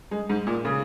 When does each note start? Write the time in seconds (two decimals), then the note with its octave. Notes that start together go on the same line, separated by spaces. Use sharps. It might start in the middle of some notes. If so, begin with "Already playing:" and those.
0.11 G#3
0.29 G#2
0.47 A#2
0.65 C#3